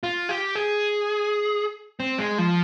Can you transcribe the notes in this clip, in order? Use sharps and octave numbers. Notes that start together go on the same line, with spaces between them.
F4
G4
G#4
C4
G#3
F3